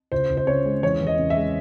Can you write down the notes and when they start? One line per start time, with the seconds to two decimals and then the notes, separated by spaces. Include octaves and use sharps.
0.12 C#2 C5
0.30 C#2
0.37 C5
0.47 C#3 C#5
0.65 G#3
0.83 E2 C#5
1.01 E2
1.07 D#5
1.19 C#3
1.30 E5
1.36 G#3